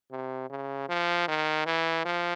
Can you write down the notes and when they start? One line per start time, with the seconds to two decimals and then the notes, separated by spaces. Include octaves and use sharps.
0.11 C3
0.50 C#3
0.89 F3
1.28 D#3
1.66 E3
2.05 F3